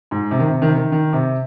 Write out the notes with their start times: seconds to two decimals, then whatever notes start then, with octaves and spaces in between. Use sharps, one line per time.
0.11 G#2
0.31 C3
0.39 D#3
0.47 C3
0.62 D#3
0.68 C3
0.76 D#3
0.92 D#3
1.13 C3